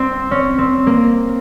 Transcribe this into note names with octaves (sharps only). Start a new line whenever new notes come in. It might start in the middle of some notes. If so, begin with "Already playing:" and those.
Already playing: C4
C#4
C4
A#3